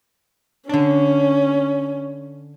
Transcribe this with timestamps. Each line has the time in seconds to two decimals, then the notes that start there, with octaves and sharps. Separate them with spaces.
0.69 D3 C#4 D4